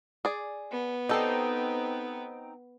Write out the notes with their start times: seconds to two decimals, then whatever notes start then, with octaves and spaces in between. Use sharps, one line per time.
0.25 G#4 D5
0.71 B3
1.09 C4 D#4 G4 A4